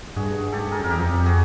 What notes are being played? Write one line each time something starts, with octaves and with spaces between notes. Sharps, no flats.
G2 F#4 G#4
G#2 G4 A4
G2
G#4 A#4
F#2
F2 A#4
E2 G4 A4
F2
F#4 G#4